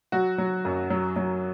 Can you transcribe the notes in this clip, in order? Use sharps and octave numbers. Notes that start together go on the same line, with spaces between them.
F#3 F#4
F#3
F#2
F#3
F#3